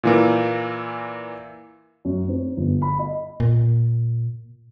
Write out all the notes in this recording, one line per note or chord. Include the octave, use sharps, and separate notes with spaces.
A#2 E3 A#3
F#2
C4
G1
B5
D#5
A#2